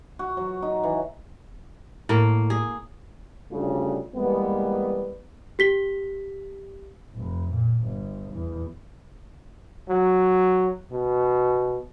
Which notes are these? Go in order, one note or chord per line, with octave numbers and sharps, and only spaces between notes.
F#4
F#3
D#4
E3
A2 A#3
G#4
D2 C#3 G3 A3 D4 F4
E2 G3 G#3 A#3 B3
G4 B6 G7
F1
A#2
G1
E2
F#3
B2